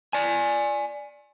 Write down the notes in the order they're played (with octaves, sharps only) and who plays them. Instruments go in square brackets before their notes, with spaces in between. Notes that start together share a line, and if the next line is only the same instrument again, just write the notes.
[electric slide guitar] D5 G#5